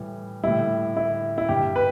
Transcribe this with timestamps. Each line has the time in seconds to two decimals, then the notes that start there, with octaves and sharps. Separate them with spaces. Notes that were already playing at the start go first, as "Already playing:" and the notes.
Already playing: A2 E3 G3
0.43 A2 G3 E4
0.97 E4
1.38 E4
1.49 G2 G3 G4
1.76 B4